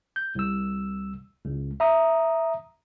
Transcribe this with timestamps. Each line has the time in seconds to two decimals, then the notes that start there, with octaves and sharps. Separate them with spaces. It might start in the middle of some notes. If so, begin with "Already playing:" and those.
0.16 G6
0.35 C2 E6
1.45 C#2
1.80 E5 A#5 D#6